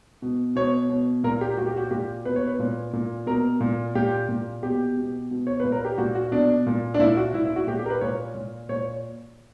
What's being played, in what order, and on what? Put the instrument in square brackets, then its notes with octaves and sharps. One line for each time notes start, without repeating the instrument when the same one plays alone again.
[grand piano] B2
B2 C#5
B2
A#2 A#4
G4
A#2 F#4
G4
F#4
A#2 G4
B2 B4
C#5
B4
A#2
A#2
B2 A#4
A#2
A#2 G4
A#2
B2 G4
B2
B2
C#5
A#2 B4
A#4
G4
A#2 F#4
F#4
B2 D4
A#2
D4
A#2 E4
F#4
A#2 E4
E4
F#4
A#2 G4
G4
A#4
B4
A#2 C#5
A#2
A#2 C#5